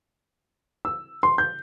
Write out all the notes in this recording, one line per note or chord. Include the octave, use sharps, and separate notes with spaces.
E6
C6
G6